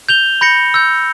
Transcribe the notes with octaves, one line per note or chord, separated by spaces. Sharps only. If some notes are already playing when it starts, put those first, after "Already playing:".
G6 F7 G7
B5 G6 A#6 C#7
E6 G6